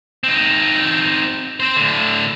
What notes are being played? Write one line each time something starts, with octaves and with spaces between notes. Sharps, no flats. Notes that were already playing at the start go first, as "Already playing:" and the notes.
C4 D#4
C4 C5
A2 D3